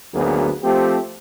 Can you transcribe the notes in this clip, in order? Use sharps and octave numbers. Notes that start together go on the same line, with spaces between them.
G#1 D2 F#3 A#3 B3 G#4
F3 A3 C4 G4